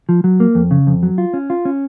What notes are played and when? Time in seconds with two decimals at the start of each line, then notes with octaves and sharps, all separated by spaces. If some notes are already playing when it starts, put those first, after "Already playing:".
0.09 F3
0.24 F#3
0.40 A#3
0.55 F2
0.71 C#3
0.87 F2
1.03 F#3
1.18 F4
1.34 C#4
1.50 F4
1.65 C#4